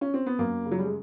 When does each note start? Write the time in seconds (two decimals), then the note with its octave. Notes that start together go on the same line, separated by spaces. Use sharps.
0.01 C#4
0.14 C4
0.26 B3
0.39 F#2 A#3
0.65 C#3
0.71 F#3
0.79 G3
0.86 G#3